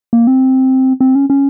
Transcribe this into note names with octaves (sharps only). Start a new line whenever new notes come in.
A#3
C4
C4
C#4
C#4